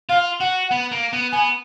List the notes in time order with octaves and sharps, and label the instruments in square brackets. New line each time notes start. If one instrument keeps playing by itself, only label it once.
[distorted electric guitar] F4 [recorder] F5
[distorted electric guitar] F#4 [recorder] F#5
[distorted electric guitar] B3
A#3
B3
[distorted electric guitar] B3 [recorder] G#5